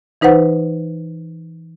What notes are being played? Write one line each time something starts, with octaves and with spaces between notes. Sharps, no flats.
E3 D#4 B4 C5 F#5